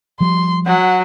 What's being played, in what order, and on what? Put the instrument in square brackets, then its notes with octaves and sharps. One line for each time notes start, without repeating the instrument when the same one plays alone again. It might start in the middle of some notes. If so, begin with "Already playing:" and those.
[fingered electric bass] F3 G3 [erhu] C6
[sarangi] F#3 [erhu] F#5